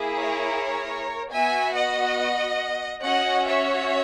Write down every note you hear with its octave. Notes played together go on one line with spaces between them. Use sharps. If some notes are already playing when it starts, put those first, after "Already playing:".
Already playing: A#3 E4 G#4
A#4 C#5
B3 F#4 E5 G#5
D#5 F#5
C#4 F#4 D#5 F#5
C#5 E5